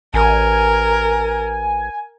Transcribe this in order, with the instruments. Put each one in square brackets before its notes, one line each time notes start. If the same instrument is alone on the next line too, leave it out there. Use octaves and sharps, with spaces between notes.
[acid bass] A1 [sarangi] A#4 [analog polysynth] G#5